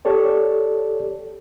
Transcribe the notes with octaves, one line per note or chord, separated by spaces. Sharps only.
G4 A4 C#5 D5